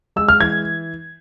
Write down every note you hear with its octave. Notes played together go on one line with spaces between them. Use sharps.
G#3 E6
F6
E3 G#6